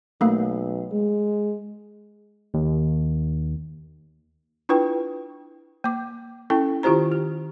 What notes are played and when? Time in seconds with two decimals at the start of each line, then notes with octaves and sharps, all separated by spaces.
0.21 B1 A3 A#3
0.92 G#3
2.54 D#2
4.69 D4 E4 F4 B4 G5
5.84 A#3 D6
6.50 C#4 E4 A4 G5
6.83 D#3 E4 F4 G4 C5 A#5
7.12 G4